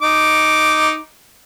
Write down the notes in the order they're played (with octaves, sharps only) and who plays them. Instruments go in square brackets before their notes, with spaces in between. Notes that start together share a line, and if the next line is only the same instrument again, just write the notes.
[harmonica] D#4 D6